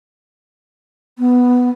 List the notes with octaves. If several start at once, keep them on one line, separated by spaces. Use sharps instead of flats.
B3